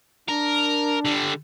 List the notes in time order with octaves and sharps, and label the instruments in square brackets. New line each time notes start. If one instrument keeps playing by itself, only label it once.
[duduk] D4 [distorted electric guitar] A#4
[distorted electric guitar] D3 G3